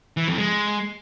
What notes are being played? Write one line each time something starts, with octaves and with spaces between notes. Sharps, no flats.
E3
F2
G#3